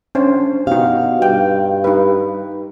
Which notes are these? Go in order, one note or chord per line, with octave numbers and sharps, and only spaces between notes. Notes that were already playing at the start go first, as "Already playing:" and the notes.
C#4 D4 C5
B2 D#4 G4 F5
G2 G5
D#4 B4